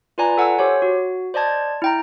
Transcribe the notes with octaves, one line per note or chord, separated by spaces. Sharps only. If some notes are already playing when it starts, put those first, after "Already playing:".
F4 B4 D5 G#5 A#5
A4 F#5 G#5 E6
G4 C5 C#5
F#4
C5 D5 D#5 A5 G#6
E4 G5 A#5